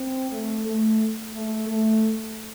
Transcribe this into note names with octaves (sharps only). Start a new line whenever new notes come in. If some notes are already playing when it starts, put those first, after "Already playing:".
Already playing: C4
A3
A3
A3
A3